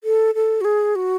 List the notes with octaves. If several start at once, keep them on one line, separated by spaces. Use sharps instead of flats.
A4
A4
F#4
G#4
F#4